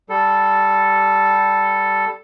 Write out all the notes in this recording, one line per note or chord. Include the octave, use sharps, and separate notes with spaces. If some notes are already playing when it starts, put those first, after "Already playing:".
G3 A4